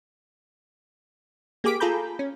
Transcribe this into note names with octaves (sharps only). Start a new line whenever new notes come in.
A#3 G4 G#4 D6 B6 D7
F4 G#4 A4 A#5 B5 G6
C#4